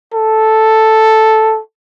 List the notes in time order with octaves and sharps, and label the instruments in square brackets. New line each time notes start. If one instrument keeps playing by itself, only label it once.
[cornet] A4